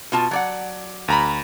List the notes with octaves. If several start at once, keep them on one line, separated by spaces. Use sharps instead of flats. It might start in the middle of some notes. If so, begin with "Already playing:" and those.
B2 F4 A5
F#3 D5 F#5
D2 A#5 B5